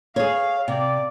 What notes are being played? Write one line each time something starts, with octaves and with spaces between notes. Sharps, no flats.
G#4 C#5 F5
C3 D5